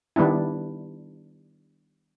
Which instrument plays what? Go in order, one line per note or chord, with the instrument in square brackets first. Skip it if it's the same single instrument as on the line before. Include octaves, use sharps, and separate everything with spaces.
[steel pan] D#3 G3 B3 D4 E4